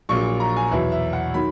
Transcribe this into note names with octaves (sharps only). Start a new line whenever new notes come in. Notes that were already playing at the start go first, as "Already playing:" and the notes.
A#1 A#2 F#3 C#6
A#5
G#5
E2 B2 F#3 E5
E5
F#5
D#3 F#3 B5